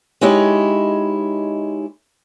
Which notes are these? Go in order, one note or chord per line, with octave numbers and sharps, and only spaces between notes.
G#3 D#4 E4 G4 C#5